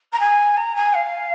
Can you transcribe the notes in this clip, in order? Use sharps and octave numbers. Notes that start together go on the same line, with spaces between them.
A#5
G#5
A#5
G#5
F5